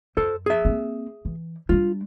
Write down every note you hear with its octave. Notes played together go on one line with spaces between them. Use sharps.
F#2 A4 C5
G#4 E5
A#3 C4
E3
G3 D4 F4